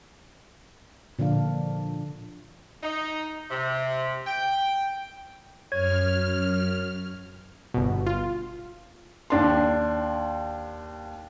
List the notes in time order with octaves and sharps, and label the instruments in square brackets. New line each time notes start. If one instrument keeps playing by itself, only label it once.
[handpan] A#2 D3 F3 D4 F5
[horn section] D#4
C3
G5
[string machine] F#2 F6 [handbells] C#5 G#6
[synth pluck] G1 B2
F4
[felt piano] D#2 D4 C6